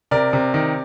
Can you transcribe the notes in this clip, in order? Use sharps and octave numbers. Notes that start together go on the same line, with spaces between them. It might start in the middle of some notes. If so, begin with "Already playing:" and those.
C3 A#4 D5
C3
D#3